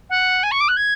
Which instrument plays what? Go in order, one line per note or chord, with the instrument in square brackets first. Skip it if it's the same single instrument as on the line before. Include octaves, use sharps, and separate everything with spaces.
[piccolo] F#5
G#5
C#6
D6
F#6
G#6